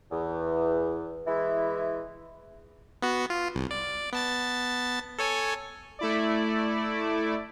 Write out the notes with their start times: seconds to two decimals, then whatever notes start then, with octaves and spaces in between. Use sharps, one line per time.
0.11 E2
1.27 E3 G#3 E4
3.02 B3 F#4
3.30 F4
3.55 C2
3.71 D5
4.13 B3 A5 A6
5.19 A4 C#5 G#5
5.99 A3 E4 D5